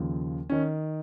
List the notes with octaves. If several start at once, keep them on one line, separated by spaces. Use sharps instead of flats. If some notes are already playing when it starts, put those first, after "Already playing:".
Already playing: D#2 C#3 F3
D#3 C#4